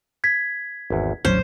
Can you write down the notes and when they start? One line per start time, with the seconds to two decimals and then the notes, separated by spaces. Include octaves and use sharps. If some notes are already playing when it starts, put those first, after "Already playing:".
0.24 G#6 B6
0.90 G#1 E2
1.25 D#1 A1 F#3 C#4 C5